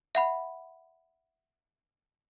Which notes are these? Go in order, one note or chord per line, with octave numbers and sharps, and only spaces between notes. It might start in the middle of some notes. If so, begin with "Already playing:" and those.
E5 F#5 B5